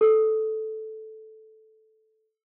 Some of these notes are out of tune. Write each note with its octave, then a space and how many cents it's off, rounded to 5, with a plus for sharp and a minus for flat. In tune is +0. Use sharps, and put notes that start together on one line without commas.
A4 -5